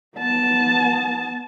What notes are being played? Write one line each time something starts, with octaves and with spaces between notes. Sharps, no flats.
B3 A5